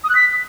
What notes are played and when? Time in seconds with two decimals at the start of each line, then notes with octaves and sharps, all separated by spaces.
0.04 D#6
0.10 F#6
0.15 B6